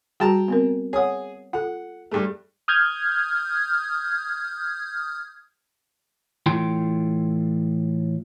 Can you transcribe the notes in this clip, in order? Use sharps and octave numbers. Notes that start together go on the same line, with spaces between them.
G3 F#4 G#4 G5 A5 A#5
B3 C4 A#4
G#4 C#5 F#5 D#6
F4 A4 F#5
G2 A3 G4 G#4
D#6 F6 G6 G#6
A2 E3 F4 G5 C6